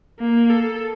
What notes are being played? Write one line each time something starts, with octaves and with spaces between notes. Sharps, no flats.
A#3
A4